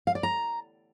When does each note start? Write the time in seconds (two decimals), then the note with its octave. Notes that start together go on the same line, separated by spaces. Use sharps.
0.07 F5
0.15 D5
0.23 A#5